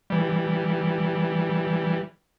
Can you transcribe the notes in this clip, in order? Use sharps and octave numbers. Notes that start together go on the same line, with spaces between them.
E3 G3